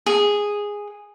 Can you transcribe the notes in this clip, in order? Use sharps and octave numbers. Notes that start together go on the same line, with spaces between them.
G#4